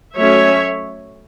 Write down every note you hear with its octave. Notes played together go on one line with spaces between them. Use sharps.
F#3 A3 C#4 C#5 E5